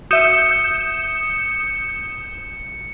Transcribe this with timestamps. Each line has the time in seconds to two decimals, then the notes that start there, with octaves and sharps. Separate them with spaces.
0.11 F#4 E5 D#6 G6 C#7 E7